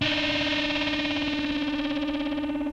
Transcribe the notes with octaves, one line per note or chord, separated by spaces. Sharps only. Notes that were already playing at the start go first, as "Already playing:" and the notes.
D4 D#4